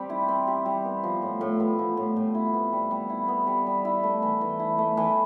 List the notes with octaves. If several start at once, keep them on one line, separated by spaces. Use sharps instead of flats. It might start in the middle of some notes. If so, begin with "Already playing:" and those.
Already playing: G3 C4 G4
E4
C4
G4
G3
B3
F3
A2
A2
B3
F3
A2
A2
E4
B3
G3
G3
E4
B3
G3
G3
E4
A3
E3
E3
E4
A3
E3